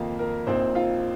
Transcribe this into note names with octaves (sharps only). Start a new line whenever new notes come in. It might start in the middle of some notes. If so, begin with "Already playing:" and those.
Already playing: F2 D#3 A#3 D#4 F4 F5
A#4
A#1 A#2 A#3 C4 D#4 C5
F4 F5